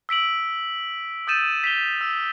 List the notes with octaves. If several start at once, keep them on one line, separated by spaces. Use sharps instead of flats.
E6 B6 D7 F#7
D#6 E6 G6 A6 D#7 E7
B6 F7 G7
E6